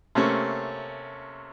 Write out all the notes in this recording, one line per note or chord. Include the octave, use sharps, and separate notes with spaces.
C3 A3 A#3 C#4